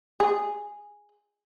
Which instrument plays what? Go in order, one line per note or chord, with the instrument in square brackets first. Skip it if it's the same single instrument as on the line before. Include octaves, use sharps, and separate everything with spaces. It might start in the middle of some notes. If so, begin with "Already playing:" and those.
[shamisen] G#4